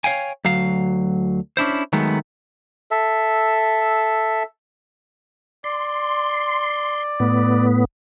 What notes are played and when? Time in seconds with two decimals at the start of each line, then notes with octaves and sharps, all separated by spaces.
0.04 C#5 F5 G5 G#5
0.45 D2 F#3 F5
1.57 C#4 D4 E4 C5
1.93 D#3 F#3 G#3 A3 B3
2.91 A4 E5
5.64 D5 C6
7.20 A2 B3